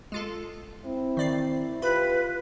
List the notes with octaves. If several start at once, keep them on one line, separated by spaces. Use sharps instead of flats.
G#3 F4 A4
C4 E4
D#3 D5 C7
F4 G4 B4 B5